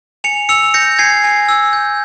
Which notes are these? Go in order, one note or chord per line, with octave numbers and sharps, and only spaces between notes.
G#5 C#7 F7
E6 C#7 F7
G6 A#6 C#7
G#5 G#6 C7
G#5
E6
G6